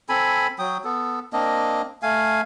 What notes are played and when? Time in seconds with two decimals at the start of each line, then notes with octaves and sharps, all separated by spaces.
0.09 C4 A4 G#5 B5
0.59 F#3 G5 D#6
0.84 B3 A4
1.33 A#3 C4 D4 D#5
2.03 A3 F5 G#5